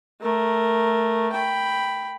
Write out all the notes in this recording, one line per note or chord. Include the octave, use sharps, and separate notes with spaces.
A3 A#4
G5 B5